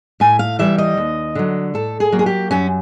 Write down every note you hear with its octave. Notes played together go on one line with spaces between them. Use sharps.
A2 G#5
F5
E3 G3 E5
D#5
D#2
D3 F#3
A2 A4
G#4
F#3 A#3
G#4
G4
F#2 C#4